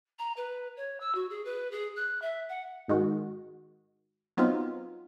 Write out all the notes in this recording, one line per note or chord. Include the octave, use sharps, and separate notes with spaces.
A#5
B4
C#5
E6
F#4
G#4
B4
G#4
F#6
E5
F#5
G#2 D#3 G#3 F#4
F#3 B3 C4 D#4 F4